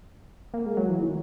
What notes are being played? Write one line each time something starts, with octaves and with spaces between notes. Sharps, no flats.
A#3
G#3
F#3
E3
D#3